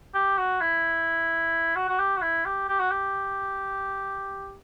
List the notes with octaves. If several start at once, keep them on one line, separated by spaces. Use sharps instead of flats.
G4
F#4
E4
F#4
F#4
G4
F#4
E4
G4
G4
F#4
G4